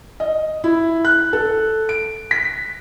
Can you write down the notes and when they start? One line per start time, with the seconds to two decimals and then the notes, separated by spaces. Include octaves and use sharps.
0.20 D#5
0.64 E4
1.05 F#6
1.33 A4
1.89 D7
2.31 B6